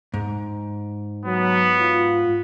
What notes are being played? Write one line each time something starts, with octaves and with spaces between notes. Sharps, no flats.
G#2
F#3 B3
F4